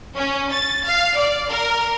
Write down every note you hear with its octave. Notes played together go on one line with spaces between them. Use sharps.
C#4
A6
F5
D5
A#4